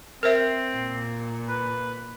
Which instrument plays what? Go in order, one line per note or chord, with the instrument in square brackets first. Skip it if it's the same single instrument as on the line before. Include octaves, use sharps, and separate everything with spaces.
[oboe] C4 [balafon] A#4 C5 E5
[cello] A#2
[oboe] B4